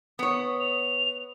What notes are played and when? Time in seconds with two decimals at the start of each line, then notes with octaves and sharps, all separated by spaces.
0.19 B3 C#5 D#6
0.60 F7